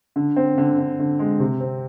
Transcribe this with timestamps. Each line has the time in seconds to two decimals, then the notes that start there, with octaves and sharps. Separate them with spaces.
0.16 D3
0.36 C4
0.58 D3
0.78 D3
0.99 D3
1.19 G#3
1.40 C3
1.60 C4